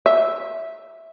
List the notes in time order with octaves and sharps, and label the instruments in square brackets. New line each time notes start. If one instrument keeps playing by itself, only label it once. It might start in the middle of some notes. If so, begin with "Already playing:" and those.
[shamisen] E5